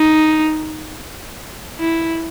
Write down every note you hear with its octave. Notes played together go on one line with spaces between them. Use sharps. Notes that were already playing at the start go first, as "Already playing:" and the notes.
Already playing: D#4
E4